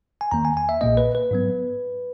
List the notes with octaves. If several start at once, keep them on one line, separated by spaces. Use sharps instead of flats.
G#5
E2 D#3 A#3 A#5
G#5
G#5
E5
A#1 A#2 A#3 D#5
B4
B4
G#2 F#3 B3